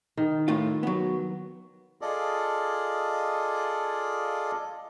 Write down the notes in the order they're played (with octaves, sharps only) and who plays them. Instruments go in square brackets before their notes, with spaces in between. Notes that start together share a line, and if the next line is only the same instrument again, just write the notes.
[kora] D#3
[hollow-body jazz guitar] A2 F4
F#3 B3
[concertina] F4 G#4 A4 D5 D#5